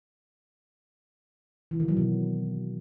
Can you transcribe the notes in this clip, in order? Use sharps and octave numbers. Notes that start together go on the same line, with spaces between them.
E3
D#3
F#3
B2